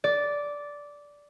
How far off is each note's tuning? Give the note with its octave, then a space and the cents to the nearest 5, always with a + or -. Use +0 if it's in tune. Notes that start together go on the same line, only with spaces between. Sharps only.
D5 -10